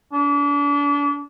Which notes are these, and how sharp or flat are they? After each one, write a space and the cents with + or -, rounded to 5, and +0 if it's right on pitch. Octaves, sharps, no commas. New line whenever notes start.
D4 -35